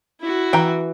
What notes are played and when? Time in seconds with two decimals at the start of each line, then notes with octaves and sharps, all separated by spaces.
0.20 E4 F#4
0.53 E3 G5 A#5